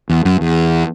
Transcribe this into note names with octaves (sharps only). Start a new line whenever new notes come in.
E2
F#2
E2